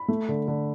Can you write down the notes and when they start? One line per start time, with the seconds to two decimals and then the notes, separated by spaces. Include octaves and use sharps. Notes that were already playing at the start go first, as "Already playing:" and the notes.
Already playing: B5
0.08 A3
0.29 D3
0.48 D3